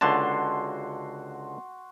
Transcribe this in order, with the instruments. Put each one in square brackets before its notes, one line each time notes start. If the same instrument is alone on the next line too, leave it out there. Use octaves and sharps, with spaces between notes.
[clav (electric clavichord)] C#2 D3 A5 [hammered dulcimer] F#4 C6